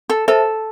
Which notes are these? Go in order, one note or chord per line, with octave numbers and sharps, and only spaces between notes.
A4
A4 C5 E5 A5